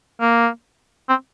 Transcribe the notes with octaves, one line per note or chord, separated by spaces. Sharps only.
A#3
C4